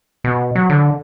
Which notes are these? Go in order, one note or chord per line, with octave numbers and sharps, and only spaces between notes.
B2
F#3
D3